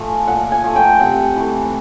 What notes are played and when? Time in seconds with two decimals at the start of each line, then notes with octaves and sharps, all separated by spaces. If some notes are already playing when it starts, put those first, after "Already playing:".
Already playing: F3 A3 G#5
0.28 A#2 F#5
0.52 G#5
0.64 F3 A3
0.76 G5
1.00 C3 F#5
1.36 E3 A3